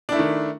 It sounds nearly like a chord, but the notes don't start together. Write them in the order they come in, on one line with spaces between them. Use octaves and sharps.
D4 E4 A3 D#3